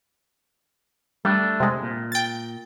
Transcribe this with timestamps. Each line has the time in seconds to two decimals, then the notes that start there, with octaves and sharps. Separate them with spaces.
1.25 G3 A3 D4
1.60 C3 G#3
1.83 A#2
2.12 G5 A6